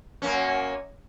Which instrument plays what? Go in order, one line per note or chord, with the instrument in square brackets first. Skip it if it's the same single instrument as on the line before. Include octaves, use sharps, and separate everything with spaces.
[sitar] F#2 A#3 C#4